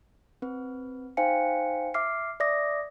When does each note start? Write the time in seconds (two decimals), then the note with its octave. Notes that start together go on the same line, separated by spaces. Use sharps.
0.42 C4 B4
1.17 D#4 C5 F5 G5 G#5 C#7
1.94 E5 D6 F6 C7
2.40 D5 E5 D6 D#6 A#6